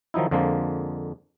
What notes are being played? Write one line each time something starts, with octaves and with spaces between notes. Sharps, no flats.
D#3 F3 F#3 D#4 E4
F2 D3 F3 G#3 A#3